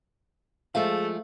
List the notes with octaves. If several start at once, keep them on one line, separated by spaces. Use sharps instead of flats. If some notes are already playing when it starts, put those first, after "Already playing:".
F3 G#3 A3 G#4 E5 F5